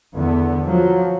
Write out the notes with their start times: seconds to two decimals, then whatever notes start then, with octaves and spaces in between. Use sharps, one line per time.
0.14 E2 D3 B3
0.65 F3 F#3